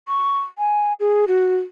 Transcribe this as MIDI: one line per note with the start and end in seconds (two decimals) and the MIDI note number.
0.08 0.39 85
0.58 0.93 80
1.00 1.25 68
1.28 1.57 66